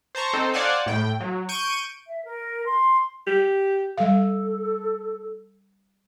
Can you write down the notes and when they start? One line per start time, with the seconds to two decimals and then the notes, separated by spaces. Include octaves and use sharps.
0.15 C5 A5 A#5 C#6
0.33 C4 D#4 A4 C5
0.54 C5 D5 F5 F#5 G#5 A5
0.86 A2 G5
1.20 F#3
1.49 C#6 G6 D7 D#7
2.07 E5
2.24 A#4
2.66 C6
3.27 G4
3.98 G3 A4 F5